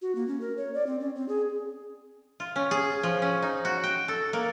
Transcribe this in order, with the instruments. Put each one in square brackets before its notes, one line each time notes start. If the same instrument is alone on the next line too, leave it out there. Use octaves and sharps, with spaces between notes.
[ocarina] F#4
A#3
C#4
A#4
C#5
D5
C4
C#4
C4
G#4
[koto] F4
C#4
G#4
F3
C#4
D#4
F#4
G5
A4
A#3